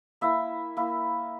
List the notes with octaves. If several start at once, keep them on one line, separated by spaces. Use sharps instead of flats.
A#3 E4 E5
A#3 E4